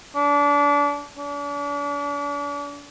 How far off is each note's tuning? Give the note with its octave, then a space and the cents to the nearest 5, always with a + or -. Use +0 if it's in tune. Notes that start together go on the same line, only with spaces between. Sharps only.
D4 -30
D4 -40